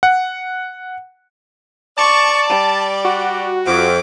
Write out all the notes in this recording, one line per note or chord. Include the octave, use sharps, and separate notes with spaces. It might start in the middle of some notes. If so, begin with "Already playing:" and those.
F#5
D5 A5 C#6
G3
F#4
F2 D6